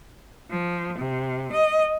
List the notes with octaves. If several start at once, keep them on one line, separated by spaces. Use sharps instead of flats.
F3
C3
D#5